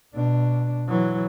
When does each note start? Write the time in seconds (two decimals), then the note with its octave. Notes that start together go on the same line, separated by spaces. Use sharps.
0.15 B2 D4
0.88 E3 F#3